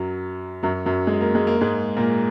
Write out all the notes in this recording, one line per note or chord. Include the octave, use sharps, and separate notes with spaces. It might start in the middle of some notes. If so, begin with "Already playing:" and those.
Already playing: F#2 F#3
F#2 F#3
F#2 F#3
G#3
A#3
G#3
A#3
G#2 G#3
A#2 A#3